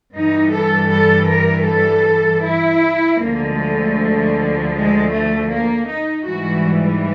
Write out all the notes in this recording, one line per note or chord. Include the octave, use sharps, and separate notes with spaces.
G2 E3 G3 D#4
A4
A4
A#4
A4
E4
D2 D3 F3 G#3 A#3
A3
G#3
A3
A#3
D#4
G#2 E3 G3 F#4